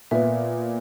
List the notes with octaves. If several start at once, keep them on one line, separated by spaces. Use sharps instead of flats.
A#2 B3 B4 E5